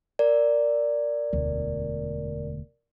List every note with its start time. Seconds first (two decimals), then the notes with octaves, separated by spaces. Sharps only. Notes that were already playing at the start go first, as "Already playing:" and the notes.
0.19 A#4 D5
1.33 E1 D2